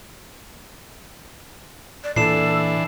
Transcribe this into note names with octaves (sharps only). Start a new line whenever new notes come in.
D5
A#2 E3 D4 A4 C7 E7